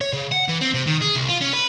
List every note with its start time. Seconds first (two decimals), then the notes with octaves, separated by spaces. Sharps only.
0.01 C#5
0.13 C#3
0.32 F#5
0.49 E3
0.61 C4
0.74 C3
0.87 D#3
1.02 G#4
1.15 C2
1.28 F4
1.41 C#4
1.53 B4